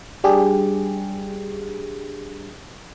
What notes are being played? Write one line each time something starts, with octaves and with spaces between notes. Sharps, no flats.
G3 D4 G4 G#4